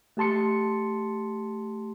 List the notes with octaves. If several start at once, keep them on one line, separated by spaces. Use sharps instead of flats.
A3 G4 A5 C6 C#7